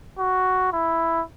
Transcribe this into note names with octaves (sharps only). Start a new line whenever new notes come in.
F#4
E4